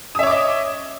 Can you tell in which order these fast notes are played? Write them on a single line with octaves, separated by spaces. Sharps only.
D#6 E5 C#5 D6 D#5